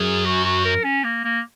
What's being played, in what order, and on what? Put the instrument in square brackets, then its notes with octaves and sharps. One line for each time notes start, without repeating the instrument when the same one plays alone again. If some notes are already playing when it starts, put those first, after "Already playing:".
Already playing: [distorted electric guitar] F#2 [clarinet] G#4
[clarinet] F#4
F#4
A#4
C#4
A#3
A#3